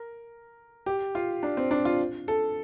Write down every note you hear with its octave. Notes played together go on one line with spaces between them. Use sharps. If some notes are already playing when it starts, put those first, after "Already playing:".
Already playing: A#4
G4
F4
D4
C4
D4
F4
A4